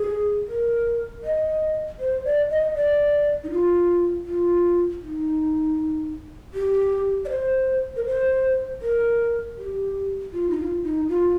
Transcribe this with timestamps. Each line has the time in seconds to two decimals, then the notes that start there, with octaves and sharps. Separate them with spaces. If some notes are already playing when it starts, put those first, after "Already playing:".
Already playing: G#4
0.48 A#4
1.24 D#5
2.00 C5
2.25 D5
2.50 D#5
2.75 D5
3.44 D#4
3.51 F4
4.27 F4
5.02 D#4
6.54 G4
7.25 D5
7.29 C5
7.96 A#4
8.06 C5
8.82 A#4
9.57 G4
10.33 F4
10.50 D#4
10.58 F4
10.83 D#4
11.09 F4